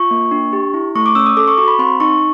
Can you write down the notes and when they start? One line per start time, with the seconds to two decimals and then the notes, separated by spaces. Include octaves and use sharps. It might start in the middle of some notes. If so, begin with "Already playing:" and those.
Already playing: F4 C#6
0.11 A#3
0.31 D4
0.53 G4
0.74 E4
0.95 A3 C#6
1.06 D6
1.15 C#4 E6
1.26 D#6
1.37 A4 D6
1.48 C#6
1.58 F#4 C#6
1.68 B5
1.79 C4 C6
2.00 D#4 C#6